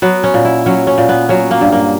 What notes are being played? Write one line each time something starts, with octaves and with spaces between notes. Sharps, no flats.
F#3 B3
C#4
A#2
E4
F#3 C#4
C#4
A#2
B3
F#3 C#4
A#3
G2
A#3